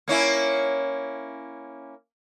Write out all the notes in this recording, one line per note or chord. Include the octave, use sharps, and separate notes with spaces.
A#3 C#4 E4